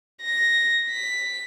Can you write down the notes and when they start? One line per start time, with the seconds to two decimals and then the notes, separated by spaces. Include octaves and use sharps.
0.21 A#6
0.90 B6